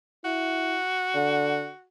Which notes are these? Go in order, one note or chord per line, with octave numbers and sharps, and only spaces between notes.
E4 F#4
D3